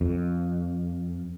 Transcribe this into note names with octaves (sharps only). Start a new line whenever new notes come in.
F2